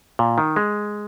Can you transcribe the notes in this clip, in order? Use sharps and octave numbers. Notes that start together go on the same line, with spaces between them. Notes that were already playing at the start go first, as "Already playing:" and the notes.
A#2
D#3
G#3